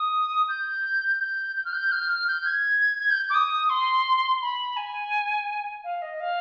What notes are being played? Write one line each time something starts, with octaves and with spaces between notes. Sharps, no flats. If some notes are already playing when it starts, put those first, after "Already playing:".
Already playing: D#6
G6
G6
G6
F6
G6
F6
G6
G#6
G#6
G6
D6
D#6
C6
B5
G#5
F5
D#5
F5